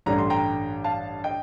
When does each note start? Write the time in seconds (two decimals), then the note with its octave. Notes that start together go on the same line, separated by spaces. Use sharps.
0.06 A1 G2 D3 G3 D4 A#5
0.18 C6
0.30 G5 A#5
0.84 F5 A5
1.24 D#5 G5